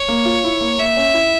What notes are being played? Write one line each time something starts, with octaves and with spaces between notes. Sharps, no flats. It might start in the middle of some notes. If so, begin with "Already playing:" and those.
Already playing: C#5
A#3
F4
E4
A#3
A#3 E5
C#4
E4